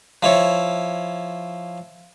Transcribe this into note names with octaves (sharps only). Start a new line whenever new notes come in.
F3 E4 C#5